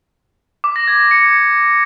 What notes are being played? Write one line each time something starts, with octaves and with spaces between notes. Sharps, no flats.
D6
A#6
G#6
A#6
C#7